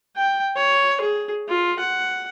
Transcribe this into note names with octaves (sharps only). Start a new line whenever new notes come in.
G5
C#5
G#4
F4
F#5